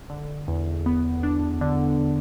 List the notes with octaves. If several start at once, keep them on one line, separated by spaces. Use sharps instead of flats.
D3
E2
B3
D4
D3